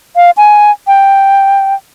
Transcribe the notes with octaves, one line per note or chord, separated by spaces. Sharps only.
F5
G#5
G5